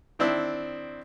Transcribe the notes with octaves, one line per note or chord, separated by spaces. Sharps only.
D#3 C4 D4 E4